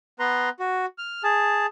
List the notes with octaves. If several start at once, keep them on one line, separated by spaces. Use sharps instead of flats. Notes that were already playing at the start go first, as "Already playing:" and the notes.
B3 B4 A#5 C6
F#4
F6
G#4 A5